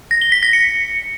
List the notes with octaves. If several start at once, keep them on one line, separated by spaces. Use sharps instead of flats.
A#6
G7
B6
A#6
C#7